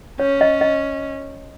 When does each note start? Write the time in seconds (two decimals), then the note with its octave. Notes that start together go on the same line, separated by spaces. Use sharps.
0.20 C#4 C#5
0.41 D#5
0.61 D#5